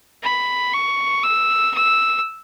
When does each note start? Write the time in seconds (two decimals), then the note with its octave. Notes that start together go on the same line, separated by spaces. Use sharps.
0.23 B5
0.73 C#6
1.24 E6
1.74 E6